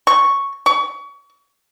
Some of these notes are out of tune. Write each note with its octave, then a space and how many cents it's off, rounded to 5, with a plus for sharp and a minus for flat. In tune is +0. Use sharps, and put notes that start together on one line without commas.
C#6 +0
C#6 +30